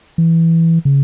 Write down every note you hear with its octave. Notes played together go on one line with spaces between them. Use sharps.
E3
C#3